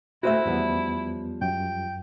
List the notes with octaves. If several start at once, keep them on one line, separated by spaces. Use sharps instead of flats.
A3 A#3 C#4 E4 F#4 C5 E5
E2 F3 G3 B3 C#4
F#2 G5